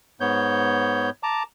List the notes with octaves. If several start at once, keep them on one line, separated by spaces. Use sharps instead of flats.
G#2 B3 C#5 G6
A5 A#5 D6